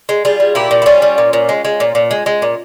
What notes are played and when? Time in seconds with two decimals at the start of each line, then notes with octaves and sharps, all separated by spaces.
0.09 G#3
0.25 G3 F4 G#4
0.40 G3
0.55 A#2 E4 G4
0.71 A#2
0.82 E4
0.86 G3 C#4 F4
1.02 G3
1.18 A#2
1.33 A#2
1.49 G#3
1.65 G#3
1.80 A#2
1.95 A#2
2.11 G#3
2.26 G#3
2.42 A#2